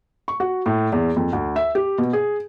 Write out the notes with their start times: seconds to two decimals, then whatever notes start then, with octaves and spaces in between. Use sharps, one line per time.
0.28 C#6
0.40 F#4
0.66 A2
0.93 E2
1.16 F2
1.33 D2
1.56 E5
1.75 G4
1.98 B2
2.13 G#4